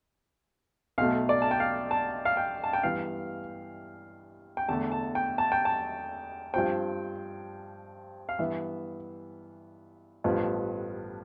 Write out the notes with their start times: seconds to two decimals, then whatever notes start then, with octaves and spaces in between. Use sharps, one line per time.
0.98 B1 B2 A3 F5
1.29 D5
1.42 A5
1.51 G5
1.60 F5
1.91 A5
2.25 F5
2.37 G5
2.64 A5
2.73 G5
2.83 G2 E3 B3 F5
4.57 G5
4.69 E2 D3 A3 A5
4.92 A5
5.15 G5
5.38 A5
5.52 G5
5.65 A5
6.54 G2 F3 C4 G5
8.29 F5
8.39 G2 E3 B3 E5
10.24 A1 G2 F3 B3